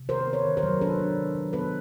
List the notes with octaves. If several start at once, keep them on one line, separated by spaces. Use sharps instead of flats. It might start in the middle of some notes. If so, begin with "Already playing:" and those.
Already playing: C3
D#3 A#4 C5
B3
B4 C#5
D#3
A#4 C5
F#3
D4 A4 B4
D4
D#3
F#3
B3 A4 B4